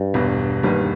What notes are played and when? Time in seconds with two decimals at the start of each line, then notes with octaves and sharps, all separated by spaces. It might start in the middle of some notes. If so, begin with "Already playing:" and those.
Already playing: G2
0.14 E1 E2 B2
0.63 E1 D#2 D#3 G3 B3